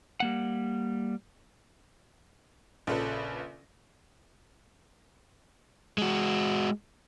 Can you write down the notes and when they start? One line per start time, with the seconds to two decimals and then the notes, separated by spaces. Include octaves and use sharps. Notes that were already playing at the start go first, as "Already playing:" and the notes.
0.20 G3 A#3 F#5
2.87 A#1 C#3 F4 A4 B4
5.98 G#3 F#4